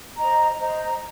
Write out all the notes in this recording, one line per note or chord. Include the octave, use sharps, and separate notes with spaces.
C5 D#5 A#5
C5 D#5 A#5